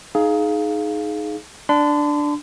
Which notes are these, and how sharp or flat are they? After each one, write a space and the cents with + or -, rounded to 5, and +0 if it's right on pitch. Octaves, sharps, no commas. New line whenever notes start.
D#4 +0 G#4 +20 F5 +0
D4 +0 C6 -45